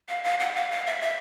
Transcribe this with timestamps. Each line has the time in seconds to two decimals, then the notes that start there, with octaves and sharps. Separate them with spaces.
0.09 F5
0.24 F5
0.40 F#5
0.55 F5
0.71 F5
0.87 E5
1.01 E5